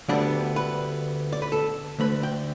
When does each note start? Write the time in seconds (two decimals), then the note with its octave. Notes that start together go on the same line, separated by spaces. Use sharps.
0.09 D2 D3 G3 B3 D4 D5
0.56 B4
1.32 D5
1.42 B4
1.52 A4
1.99 D2 D3 A3 B4
2.23 G5